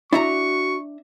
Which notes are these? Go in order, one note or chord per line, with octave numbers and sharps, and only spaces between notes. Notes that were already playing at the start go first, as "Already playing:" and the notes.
D4 E4 F#4 E5 A#5 C#6